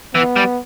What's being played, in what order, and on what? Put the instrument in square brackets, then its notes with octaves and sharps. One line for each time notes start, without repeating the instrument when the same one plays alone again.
[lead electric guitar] E3 [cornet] B3
[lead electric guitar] G3